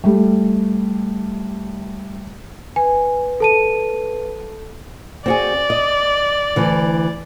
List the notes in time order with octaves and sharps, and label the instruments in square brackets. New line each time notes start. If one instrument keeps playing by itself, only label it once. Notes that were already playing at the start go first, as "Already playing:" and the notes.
[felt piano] G3 A3
[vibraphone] B4 [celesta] G#5
[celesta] A4 A5 D#7
[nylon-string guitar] C4 F#4 G#4 [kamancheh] D5
[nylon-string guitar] D#5
D2 E3